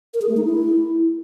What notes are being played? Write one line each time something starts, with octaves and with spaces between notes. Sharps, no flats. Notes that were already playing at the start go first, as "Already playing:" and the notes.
A#4
G#4
A3
D#4
E4